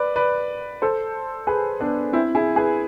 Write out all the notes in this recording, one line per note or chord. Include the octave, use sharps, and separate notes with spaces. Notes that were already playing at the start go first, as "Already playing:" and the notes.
Already playing: B4 D5
B4 D5
A4 C5
G#4 B4
B3 D4
C4 E4
E4 G#4
G#4 B4